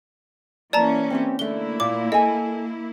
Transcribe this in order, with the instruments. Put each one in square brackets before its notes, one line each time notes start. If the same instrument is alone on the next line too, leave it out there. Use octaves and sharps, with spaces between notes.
[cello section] E3 A#3 C#4 [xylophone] D5 A5 A#5
[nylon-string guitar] C4 E4 G4
[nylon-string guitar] D3 A3 [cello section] A#3 E4 [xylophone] G7
[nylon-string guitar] A#2 [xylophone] D6
[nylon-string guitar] A4 G#5 [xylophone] D#5